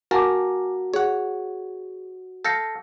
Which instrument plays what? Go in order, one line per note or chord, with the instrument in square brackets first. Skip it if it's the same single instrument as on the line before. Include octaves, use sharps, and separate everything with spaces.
[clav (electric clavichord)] A#3 A#4 A5 [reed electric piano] F#4 [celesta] G#5 D6
[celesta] G#4 [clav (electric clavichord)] C#5 F#5
[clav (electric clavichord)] A4 F5 [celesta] G6 A#6 C#7